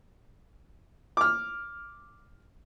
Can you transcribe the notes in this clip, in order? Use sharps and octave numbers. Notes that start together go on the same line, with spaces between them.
D6 F6